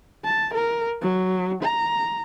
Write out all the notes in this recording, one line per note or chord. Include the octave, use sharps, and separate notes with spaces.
A5
A#4
F#3
A#5